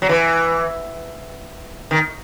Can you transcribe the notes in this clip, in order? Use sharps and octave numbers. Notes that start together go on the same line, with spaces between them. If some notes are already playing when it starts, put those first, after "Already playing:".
F#3
E3
D#3